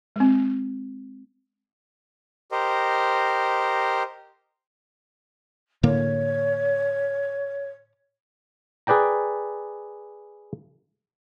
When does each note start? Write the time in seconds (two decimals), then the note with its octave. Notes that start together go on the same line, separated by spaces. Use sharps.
0.16 G#3 C4
2.52 G4 A#4 C5 D#5
5.83 A2 D3 A#3 C#5
8.87 G#4 B4 D5 G5 A#5